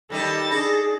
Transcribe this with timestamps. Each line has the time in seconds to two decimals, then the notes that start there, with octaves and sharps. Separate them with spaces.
0.10 D#2 G3 D#4 A4 A6 A#6
0.51 D4 G#4